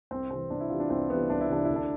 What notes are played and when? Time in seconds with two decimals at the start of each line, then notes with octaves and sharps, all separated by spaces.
0.11 C2 C4
0.30 C3 E3 C4
0.50 C2 D4
0.60 E4
0.70 C3 E3 F4
0.80 D4
0.90 C2 C4
1.10 C3 E3 B3
1.30 C2 D4
1.41 E4
1.50 C3 E3 D4
1.65 D2 E4
1.76 D4